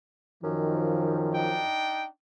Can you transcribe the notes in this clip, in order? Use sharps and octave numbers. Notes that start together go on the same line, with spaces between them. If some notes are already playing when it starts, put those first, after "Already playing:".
F#2 D#3 F3
D4 D#4 G5